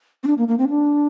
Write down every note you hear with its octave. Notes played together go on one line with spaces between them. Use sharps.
C4
D4
A#3
A#3
C4
D4